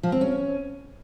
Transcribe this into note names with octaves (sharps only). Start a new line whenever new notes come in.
F3
C4
C#4